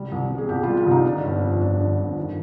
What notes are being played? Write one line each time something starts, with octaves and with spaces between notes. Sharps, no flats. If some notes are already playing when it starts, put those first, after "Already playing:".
Already playing: C2 G3
C2
B2
G#4
C2 G4
G3 F4
F4
C2 D#4
D3 D4
G1
F2
G1 D4
D3
G1
D#3